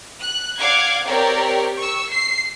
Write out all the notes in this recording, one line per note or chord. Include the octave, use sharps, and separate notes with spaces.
F#6
D5 F5 F#5 D6 G#6
C4 G4 A#4 C#5 D5
C#6 E6
C7